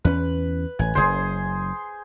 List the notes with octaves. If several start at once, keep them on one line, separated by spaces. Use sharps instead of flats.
E2 C#4 B4
A1 G#5
F#1 C#3 G#4 C5